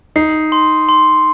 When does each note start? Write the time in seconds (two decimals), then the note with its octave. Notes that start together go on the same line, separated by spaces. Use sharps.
0.16 D#4 C7
0.52 C6
0.89 C6